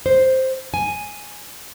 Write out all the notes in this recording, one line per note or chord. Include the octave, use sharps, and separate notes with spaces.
C5
G#5